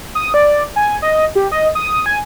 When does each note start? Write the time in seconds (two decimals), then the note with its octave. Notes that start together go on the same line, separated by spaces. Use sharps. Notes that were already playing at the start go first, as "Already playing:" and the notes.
0.15 D#6
0.34 D5
0.76 G#5
1.02 D#5
1.35 G4
1.52 D#5
1.75 D#6
2.06 G#5